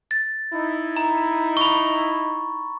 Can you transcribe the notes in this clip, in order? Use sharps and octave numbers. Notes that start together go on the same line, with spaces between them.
A6
D#4 E4
A#5
B5 C#6